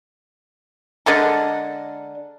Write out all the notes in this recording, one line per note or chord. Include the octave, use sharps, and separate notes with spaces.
D3 G#3 A4 A#4